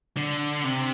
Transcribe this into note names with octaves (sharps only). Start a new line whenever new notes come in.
D3
C3